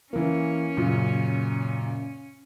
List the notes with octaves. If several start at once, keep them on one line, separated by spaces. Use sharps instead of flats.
E3 A#3 C#4
F#2 A#2 C#3